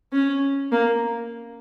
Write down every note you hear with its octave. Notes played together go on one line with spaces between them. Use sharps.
C#4
A#3